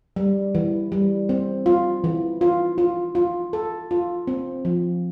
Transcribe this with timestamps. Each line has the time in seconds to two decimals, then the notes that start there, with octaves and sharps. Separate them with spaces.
0.16 G3
0.55 E3
0.92 G3
1.29 C4
1.66 F4
2.04 E3
2.41 F4
2.78 F4
3.15 F4
3.53 A4
3.91 F4
4.27 C4
4.65 F3